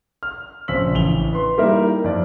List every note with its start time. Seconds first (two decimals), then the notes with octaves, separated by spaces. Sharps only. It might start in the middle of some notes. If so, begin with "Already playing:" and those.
0.23 F6
0.68 A#1 C#3 C4 E6 B6 F#7
0.95 A1 F7 G7
1.33 B4 C6
1.58 G3 A#3 D#4 E4 A#4 E5
2.04 F2 D5